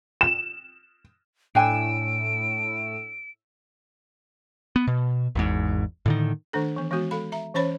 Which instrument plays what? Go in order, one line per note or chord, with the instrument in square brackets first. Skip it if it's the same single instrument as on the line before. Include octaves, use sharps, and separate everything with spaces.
[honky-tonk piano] E7
[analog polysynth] A2 E6 [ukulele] D4 G5 G#5 [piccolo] D7
[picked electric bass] B3
B2
G#1 E2 G#2
A2 D3 D#3
[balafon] D#3 A3 D4 A4
E3 B3
E3 G#3 B3 F#4
G#3 A4 F5 B5
E5 A#5
E3 C#4 C5 C#5 B5